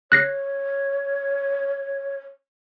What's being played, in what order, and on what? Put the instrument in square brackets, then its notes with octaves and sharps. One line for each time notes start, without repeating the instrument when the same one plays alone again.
[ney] C#5 [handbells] F#6 A#6 C7